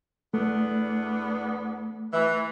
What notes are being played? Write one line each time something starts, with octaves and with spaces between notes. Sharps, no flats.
E2 A3 B3 D4
E3